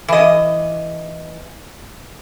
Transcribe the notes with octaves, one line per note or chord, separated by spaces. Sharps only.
E3 D#5